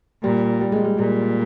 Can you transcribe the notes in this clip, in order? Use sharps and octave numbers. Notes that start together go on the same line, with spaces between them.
A#2 G3
G3
G#3
G3
A#2 G3